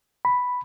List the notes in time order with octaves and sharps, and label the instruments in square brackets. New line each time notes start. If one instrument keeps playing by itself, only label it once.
[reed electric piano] B5